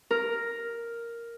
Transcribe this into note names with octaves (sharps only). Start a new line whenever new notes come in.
A#4